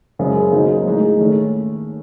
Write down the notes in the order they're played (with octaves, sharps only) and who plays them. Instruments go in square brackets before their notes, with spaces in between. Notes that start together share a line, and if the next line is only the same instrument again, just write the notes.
[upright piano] F#2 C#3 G#3 C4
D#2 C#3 F#3 C4 D#4
A2 G#3 D#4
D#2 D#3 A3 C#4